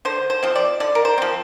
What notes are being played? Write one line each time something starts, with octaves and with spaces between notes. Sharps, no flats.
D3 C5
C5
F3 C4
D5
D3 D5
A#4
C5
F3 C4